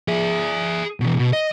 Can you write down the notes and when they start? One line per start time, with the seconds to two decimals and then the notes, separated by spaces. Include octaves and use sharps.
0.08 G#4 E5
1.00 B2 E3
1.19 B2
1.33 D#5